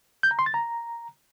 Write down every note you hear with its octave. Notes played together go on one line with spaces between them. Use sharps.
G6
A#5
C6
A6
A#5